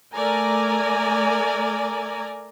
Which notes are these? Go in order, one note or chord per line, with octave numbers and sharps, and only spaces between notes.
A3 A#4 D5 G#5 A#5